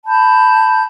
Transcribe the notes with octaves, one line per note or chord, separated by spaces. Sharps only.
A5 B5 G6